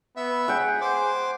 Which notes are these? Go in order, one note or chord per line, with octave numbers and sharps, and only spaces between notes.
B3 E5
G#4 F#5 G5
C5 D6